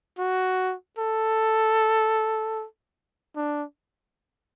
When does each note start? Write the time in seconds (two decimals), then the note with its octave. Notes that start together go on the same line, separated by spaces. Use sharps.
0.18 F#4
0.98 A4
3.36 D4